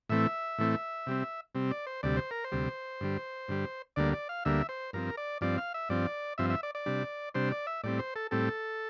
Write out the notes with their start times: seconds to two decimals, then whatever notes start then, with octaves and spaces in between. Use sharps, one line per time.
0.09 A2 E3 A3 C4 E5
0.58 A2 E3 A3 C4
1.07 C3 G3 C4
1.55 C3 G3 C4
1.71 D5
1.87 C5
2.03 D2 C3 G3 D5
2.17 C5
2.31 A#4
2.44 C5
2.52 D2 C3 G3
3.01 G2 D3 G3
3.48 G2 D3 G3
3.96 D2 D3 G3 A#3 D5
4.13 D5
4.29 F5
4.45 D2 D3 G3 A#3 E5
4.69 C5
4.93 G2 F3 C4 A#4
5.17 D5
5.41 G2 F3 C4 D5
5.58 F5
5.74 E5
5.89 G2 F3 C4 D5
6.38 G2 F3 C4 E5
6.50 E5
6.63 D5
6.75 D5
6.86 C3 G3 D4
7.35 C3 G3 D4 C5
7.52 D5
7.67 E5
7.84 A2 G3 C4 D5
7.99 C5
8.16 A4
8.31 A2 G3 C4 A4